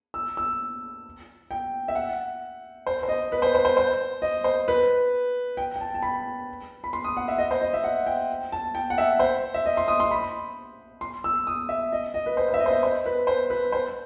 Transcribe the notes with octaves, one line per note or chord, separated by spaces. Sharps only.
E6
E6
G5
E5
F#5
C5
C5
D#5
B4
C5
C5
C5
C5
D#5
C5
B4
G5
G5
A5
A5
B5
B5
C6
D#6
F#5
E5
D#5
C5
D#5
E5
F#5
G5
A5
G5
F#5
E5
C5
E5
D#5
C6
D#6
C6
B5
C6
E6
D#6
E5
D#5
D#5
B4
C5
C5
E5
D#5
C5
D#5
C5
B4
C5
B4
C5